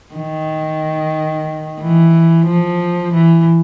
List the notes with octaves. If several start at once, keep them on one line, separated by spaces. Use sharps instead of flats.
D#3
E3
F3
E3